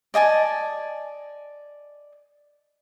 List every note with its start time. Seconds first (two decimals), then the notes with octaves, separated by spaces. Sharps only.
0.14 D5 D#5 G#5 A5